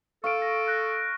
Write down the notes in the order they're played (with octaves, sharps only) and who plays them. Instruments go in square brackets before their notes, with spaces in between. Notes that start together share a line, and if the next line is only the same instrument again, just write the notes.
[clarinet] A4 [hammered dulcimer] F5 [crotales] C#6 D7
[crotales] A#6
F6 F#6 A#6